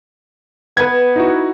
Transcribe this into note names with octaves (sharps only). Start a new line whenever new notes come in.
B3 B4 G#6
D#4 E4 F#4